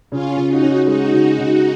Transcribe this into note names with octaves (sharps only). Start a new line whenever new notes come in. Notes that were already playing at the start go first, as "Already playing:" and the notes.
C#3 C#4 F4
C#3
D#4 F#4
C#4
G#3 D#4 F#4
C#3
C#3